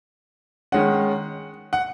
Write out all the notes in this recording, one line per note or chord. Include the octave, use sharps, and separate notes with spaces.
D#3 G#3 C#4 F#5
F#5